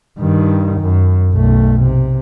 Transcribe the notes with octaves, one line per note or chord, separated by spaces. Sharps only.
G2 D#3
F#2
B1 A3
C3